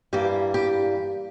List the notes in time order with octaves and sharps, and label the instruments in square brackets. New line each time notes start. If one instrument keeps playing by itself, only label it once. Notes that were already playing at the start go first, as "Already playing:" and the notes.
[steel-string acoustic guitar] G2 E3 G3 A#3 G4
G4